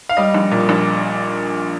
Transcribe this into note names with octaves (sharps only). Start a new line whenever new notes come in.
F5
G3 D#5
A#1
A#2
A#1